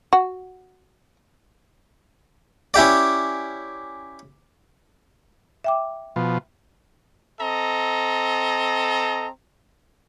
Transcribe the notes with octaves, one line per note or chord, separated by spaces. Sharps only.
F#4
C#4 E4 G4 D5
E5 G5 D6
B2 F3
C4 A4 D#5 A#5